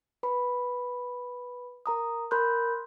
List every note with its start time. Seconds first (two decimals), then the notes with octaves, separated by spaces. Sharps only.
0.23 B4 B5
1.86 A#4 A#5 D#6
2.31 A#4 B5 C6 F#6 G6